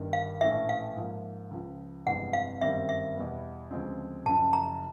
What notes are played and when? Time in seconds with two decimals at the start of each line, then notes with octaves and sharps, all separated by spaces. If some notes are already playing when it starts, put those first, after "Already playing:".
Already playing: G1 G2 D#3
0.13 F5
0.41 A#1 A2 E3 A3 C#4 E5
0.69 F5
0.96 G#2 F3 A#3
1.51 C#2 C#3 F3
2.06 G1 F2 C3 E3 G#3 F#5
2.33 F5
2.61 G1 F#2 D#3 G3 C4 E5
2.89 E5
3.16 E2 B2 G3 B3
3.71 D2 C#3 F3 G#3 C4
4.26 F#1 F#2 C#3 F3 A5
4.53 A#5